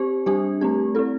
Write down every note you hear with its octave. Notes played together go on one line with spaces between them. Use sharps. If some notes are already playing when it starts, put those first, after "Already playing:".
Already playing: C4 G4 C5
G3 D4 G4 C5
A3 C4 G4
C4 E4 A4